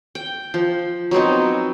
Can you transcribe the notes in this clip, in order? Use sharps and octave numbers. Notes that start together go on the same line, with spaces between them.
G5
F3
F#3 B3 C4 D#4